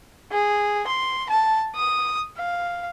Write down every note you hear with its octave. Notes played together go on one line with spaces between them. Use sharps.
G#4
C6
A5
D#6
F5